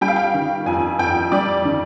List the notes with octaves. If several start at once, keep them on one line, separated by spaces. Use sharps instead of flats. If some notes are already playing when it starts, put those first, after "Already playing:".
G3 G5
F5
G5
D#3
F2 G#5
F2 G5
G3 D5
D#3